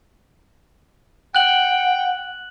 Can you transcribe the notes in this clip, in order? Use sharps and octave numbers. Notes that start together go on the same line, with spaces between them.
F#5 G5 F#6 F#7